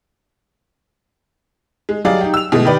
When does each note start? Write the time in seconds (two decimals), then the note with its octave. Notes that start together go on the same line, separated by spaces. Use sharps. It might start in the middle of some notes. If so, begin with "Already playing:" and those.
1.89 G#3
2.05 F#3 G3 G#4 D5 D#5 F5
2.21 D#4 G4
2.34 E6 F7
2.52 B2 E3 G#3 A3
2.65 D#3 G4 B4 D5